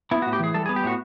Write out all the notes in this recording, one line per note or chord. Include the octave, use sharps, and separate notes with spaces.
B3 E4
A2 F#4
G4
E3 G#4
G3 A4
B3 G#4
G4
A2 F#4